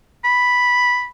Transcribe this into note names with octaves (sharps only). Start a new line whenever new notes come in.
B5